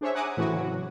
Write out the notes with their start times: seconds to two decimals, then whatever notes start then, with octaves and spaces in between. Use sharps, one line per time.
0.01 D4 G#4 C5 C#5 E5
0.14 F#5 G#5 A#5 D6 D#6
0.37 A2 E3 C4 C#4 E4 F#4
0.54 C#3 F#3